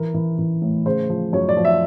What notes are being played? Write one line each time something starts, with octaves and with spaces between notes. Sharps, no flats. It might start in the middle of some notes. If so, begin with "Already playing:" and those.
Already playing: E3 A#4
E3
E3
A2
C#3 C5
F3
F#2 C#5
D5
F3
E5